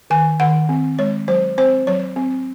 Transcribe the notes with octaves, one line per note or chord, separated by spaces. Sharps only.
D#3 G#5
D#3 F#5
C4
G#3 C#5
F#3 C5
C4 C5
F#3 C#5
C4